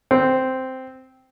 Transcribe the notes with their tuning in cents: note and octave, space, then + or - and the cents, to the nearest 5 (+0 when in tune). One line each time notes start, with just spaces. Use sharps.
C4 -5